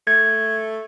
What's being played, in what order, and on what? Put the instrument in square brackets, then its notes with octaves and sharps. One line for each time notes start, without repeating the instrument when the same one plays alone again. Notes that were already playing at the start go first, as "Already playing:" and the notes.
[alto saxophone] A3 [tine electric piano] G#6